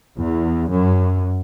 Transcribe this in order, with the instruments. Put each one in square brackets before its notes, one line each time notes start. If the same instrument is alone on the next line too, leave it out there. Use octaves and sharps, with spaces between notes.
[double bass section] E2
F#2